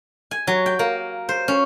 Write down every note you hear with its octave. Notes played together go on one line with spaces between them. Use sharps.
G#5
F#3
G5
A#3
C5
C#4